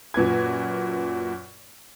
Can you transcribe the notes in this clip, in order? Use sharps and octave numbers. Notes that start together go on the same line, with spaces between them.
F#2 A#2 B4 G#6